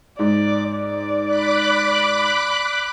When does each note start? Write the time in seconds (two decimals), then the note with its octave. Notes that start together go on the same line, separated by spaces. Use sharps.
0.19 G#2 D5
0.72 D5
1.26 B5 D6 F#6